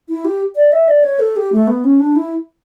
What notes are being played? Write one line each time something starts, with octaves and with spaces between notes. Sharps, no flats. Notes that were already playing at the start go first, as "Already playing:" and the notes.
E4
G4
D5
E5
D5
C#5
A4
G4
A3
B3
C#4
D4
E4